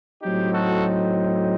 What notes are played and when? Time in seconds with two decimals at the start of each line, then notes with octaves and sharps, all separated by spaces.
0.22 A2 F#3 C4 D#4 G4
0.53 F#4 A4